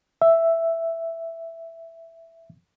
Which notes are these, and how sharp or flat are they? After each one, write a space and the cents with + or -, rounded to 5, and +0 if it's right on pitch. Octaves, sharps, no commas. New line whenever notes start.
E5 +5